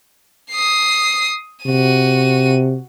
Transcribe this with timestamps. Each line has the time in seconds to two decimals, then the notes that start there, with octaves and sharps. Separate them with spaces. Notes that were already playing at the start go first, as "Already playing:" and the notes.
0.51 D#6 C7
1.66 C3 F#4 D#7